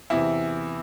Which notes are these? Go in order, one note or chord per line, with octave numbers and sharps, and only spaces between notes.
E2 C3 E3 E4